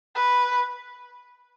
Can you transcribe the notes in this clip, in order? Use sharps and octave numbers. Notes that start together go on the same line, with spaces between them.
B4